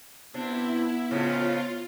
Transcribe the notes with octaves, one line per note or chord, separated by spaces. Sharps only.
C3 B3 D4 E4
F2 A2 C#3 F4